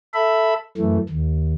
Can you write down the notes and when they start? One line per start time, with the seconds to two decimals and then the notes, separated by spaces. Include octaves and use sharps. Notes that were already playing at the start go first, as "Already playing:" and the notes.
0.14 A4 E5 B5
0.77 F#2 E3 A3
1.09 D#2